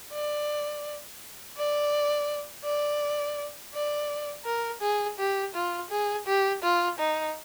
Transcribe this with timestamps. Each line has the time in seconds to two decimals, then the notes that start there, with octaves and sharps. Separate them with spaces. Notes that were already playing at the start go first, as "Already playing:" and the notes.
0.13 D5
1.57 D5
2.64 D5
3.74 D5
4.45 A#4
4.81 G#4
5.18 G4
5.54 F4
5.90 G#4
6.27 G4
6.63 F4
6.98 D#4